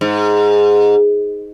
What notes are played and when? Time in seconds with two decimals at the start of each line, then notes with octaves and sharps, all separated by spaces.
0.01 G#2